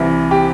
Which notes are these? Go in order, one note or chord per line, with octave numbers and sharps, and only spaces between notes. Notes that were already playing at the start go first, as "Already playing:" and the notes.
Already playing: C2 C3 E3
G4